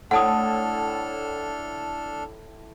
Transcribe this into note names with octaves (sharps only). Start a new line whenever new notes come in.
A2 D4 A4 F#5 A5 D#6 F6